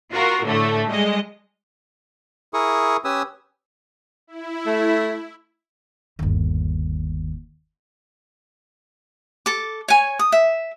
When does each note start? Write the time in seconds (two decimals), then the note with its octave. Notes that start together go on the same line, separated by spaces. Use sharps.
0.12 F4 F#4 A#4
0.44 A2 D3 A3
0.88 G3 G#3 D#5
2.54 E4 G#4 A#4 C#6 D#6
3.05 C#4 G4 B4 G#5 D#6 E6
4.27 E4
4.66 A3
6.19 G1 D#2
9.46 A4 D6
9.88 C#5 G#5
10.19 D#6
10.32 E5